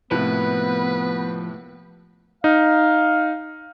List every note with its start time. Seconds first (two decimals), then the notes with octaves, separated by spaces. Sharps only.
0.11 A2 C3 F3 A#3 B3 B4 F#6
2.44 D#4 F5